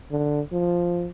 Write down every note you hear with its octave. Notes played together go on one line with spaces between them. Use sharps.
D3
F3